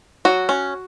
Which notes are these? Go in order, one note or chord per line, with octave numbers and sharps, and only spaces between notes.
F#3 F#4
C#4